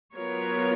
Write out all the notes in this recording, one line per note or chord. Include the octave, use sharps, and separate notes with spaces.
F#3 B3 F4 A#4 C#5